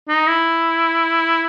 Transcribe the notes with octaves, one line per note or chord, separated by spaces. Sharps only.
D#4
E4